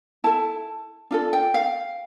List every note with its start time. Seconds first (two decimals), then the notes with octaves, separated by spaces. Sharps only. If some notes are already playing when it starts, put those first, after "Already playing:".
0.24 E4 A4 A5
1.11 D4 F4 A4
1.33 G5
1.54 F5